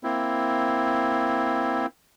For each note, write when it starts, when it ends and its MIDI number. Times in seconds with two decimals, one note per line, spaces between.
0.04 1.86 58
0.04 1.86 60
0.04 1.86 64